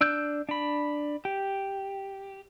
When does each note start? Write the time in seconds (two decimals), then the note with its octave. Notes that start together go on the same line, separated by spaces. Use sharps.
0.01 D4 E6 F#6 G6
0.49 D4 B5
1.25 G4